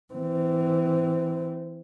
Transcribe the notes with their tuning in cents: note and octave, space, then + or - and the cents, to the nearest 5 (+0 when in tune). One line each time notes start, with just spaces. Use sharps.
E3 +0 C4 -30